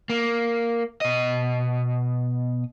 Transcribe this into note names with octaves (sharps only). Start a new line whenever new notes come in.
A#3
B2 D#5